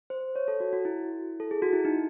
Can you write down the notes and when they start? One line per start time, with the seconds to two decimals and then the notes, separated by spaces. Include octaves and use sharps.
0.10 C5
0.36 C#5
0.48 A4
0.60 F#4
0.73 F#4
0.85 E4
1.40 A4
1.51 G#4
1.62 F#4
1.73 E4
1.85 D#4